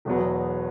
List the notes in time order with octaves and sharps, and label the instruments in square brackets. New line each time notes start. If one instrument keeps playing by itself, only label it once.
[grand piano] E1 E2 B2 F#3 B3